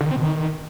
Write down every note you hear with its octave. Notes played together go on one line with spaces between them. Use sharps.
D3
D#3
C4
B2
D#3